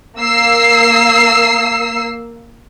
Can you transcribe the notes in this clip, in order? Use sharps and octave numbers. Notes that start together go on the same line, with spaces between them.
A#3 E6 C7